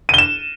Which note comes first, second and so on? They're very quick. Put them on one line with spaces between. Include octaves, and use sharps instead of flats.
D#7 G7 E7